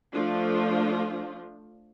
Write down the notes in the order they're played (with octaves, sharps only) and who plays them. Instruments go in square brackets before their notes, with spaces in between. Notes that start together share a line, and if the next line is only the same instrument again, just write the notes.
[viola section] F3 A3 D4 F4